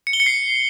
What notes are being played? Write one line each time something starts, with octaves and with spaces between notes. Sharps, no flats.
C#7
G7
C#7
C7